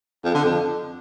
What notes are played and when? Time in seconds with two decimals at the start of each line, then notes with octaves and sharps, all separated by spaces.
0.24 F2
0.34 D3
0.44 F2